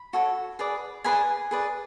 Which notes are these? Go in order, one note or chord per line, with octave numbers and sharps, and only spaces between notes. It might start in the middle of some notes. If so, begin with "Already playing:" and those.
Already playing: B5
F#4 A4 C#5
G#4 B4 D5
G#4 B4 D5 G#5 B5
G#4 B4 D5